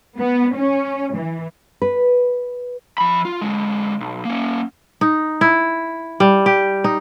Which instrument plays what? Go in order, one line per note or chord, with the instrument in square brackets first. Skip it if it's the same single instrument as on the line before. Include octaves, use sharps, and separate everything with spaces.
[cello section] B3
C#4
E3
[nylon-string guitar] B4
[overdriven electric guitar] F3 B5
F4
D3 G#3
B1
A#3 C#4
[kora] D#4
E4
G3
G4
D#4